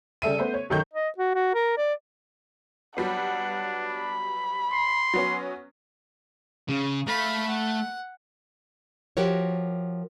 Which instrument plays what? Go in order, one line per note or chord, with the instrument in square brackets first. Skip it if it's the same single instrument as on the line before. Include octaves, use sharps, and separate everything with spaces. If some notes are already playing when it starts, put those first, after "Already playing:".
[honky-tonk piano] C#3 G3 A4 E5 D#7
A3 B3 C5
C#5
B1 F#2 D#3 A4 C#6 G6
[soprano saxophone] D#5
F#4
F#4
A#4
D5
[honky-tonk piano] F#3 G3 B3 [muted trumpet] D4 [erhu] F#5
[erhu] B5
[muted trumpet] C6
[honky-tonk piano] F#3 B3 C#4
[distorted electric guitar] C#3
[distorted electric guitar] A3 [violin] F5 B5
[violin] F#5
[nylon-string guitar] F3 F#4 G4 A#4 C#5